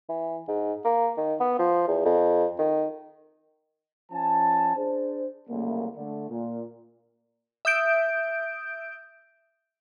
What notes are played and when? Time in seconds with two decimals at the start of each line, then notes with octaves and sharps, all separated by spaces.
0.09 E3
0.48 G#2
0.85 A#3
1.18 D#3
1.40 B3
1.59 F3
1.88 E2
2.05 F2
2.59 D#3
4.12 F3 C#4 G#5 A5
4.77 D4 G#4 C5
5.50 C2 F#2 C#3 A3 A#3
5.96 D3 A3
6.29 A#2
7.65 E5 D#6 G6 D7